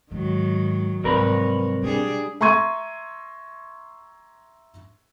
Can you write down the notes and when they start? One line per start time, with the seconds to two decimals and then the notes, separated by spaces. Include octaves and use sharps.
0.12 G#2 D#3 F#3
1.04 C2 G#2 F#3 A#4 B4 C#5
1.82 B2 G3 D4 G#4
2.41 E5 A#5 C6 C#6 G#6 D#7